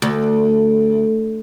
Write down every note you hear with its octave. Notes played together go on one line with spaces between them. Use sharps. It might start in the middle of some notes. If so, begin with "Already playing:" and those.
D2